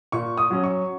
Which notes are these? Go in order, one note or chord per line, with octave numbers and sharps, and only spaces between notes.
A#2 C#6
D#6
F#3 C#4
C#6